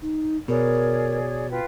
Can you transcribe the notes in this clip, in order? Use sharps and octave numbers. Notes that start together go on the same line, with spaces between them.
D#4
B2 G#4 A#4 C#5 D5
F4 B4 G5